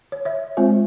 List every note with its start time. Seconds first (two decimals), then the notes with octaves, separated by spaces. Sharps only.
0.12 C#5
0.25 C#5 E5
0.57 G#3 C4 F4 C5